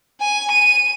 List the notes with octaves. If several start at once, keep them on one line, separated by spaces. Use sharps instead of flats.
G#5
D#7